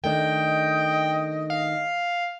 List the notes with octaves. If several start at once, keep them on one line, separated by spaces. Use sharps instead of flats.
D#3 A3 D4 D#5 G5
F5